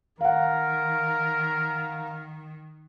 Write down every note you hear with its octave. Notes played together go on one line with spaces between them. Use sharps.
D#3 A#4 F5 F#5